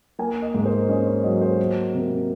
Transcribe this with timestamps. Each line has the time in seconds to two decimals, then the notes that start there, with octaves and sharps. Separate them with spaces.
0.19 A#3 G#5
0.42 D#5
0.54 G#2 A#4
0.66 C5
0.89 C#4 D#5
1.07 C#5
1.23 F#3 D#5
1.41 C5
1.59 A#3
1.94 C3 A#4